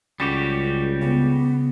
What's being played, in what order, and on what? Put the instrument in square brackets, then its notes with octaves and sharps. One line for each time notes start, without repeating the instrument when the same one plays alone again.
[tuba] C#2 [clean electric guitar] G3 F#4 G4 [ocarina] C#4
[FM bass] C#3 [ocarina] B3